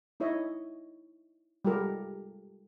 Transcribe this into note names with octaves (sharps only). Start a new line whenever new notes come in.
D#4 E4 C#5 D#5 E5
G3 G#3 F4 G4 A4 A#4